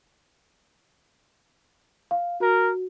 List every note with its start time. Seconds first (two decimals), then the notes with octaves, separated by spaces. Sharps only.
2.11 F5
2.40 F#4 A#4